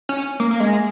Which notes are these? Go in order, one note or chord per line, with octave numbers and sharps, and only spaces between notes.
C#4
A#3
A#3
G#3